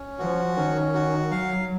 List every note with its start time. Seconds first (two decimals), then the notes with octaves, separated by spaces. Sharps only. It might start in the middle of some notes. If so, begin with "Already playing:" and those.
Already playing: C#4
0.19 F3 F#4
0.56 D#3 C#4
0.94 F#4
1.31 F#3 F5